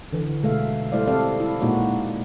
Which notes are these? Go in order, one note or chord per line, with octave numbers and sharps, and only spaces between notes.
D3 E3
B2 G#3 A3 E5 F5
G3 A3 E4 C5 D5 F5
C4 A4 D5 F5
E4
A#2 G#3 A#3 D#4 F#4 D5